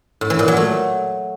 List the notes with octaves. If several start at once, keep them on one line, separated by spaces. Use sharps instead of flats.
A2
E3
A#2
F#3
A3